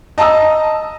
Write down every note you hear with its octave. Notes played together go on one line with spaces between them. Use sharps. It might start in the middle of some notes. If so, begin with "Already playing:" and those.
D#5 A5 A#5 D#6 E6